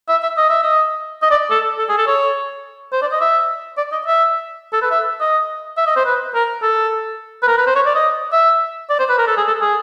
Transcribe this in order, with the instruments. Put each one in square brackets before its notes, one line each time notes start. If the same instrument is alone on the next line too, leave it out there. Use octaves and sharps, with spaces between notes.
[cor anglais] E5
E5
D#5
E5
D#5
D#5
D5
A4
A4
G#4
A4
C#5
C5
D5
D#5
E5
D5
D#5
E5
A4
B4
E5
D#5
E5
D#5
C5
B4
A#4
A4
B4
A#4
B4
C5
C#5
D5
D#5
E5
D5
C5
B4
A#4
A4
G#4
A4
G#4